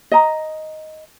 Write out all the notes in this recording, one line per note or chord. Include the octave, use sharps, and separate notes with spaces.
D#5 A#5